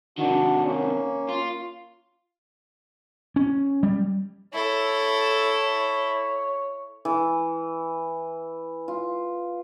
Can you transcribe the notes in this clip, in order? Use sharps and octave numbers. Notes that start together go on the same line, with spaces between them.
C3 D#3 D4 F#4
A#3 C#4
F4
C#4
G3
E4 A4 C#5
E3
F4